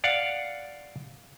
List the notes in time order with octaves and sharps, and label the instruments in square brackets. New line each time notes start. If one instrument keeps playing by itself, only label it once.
[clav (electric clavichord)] D5 F5 F#5